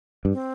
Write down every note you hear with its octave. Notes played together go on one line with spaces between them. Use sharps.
G2
C4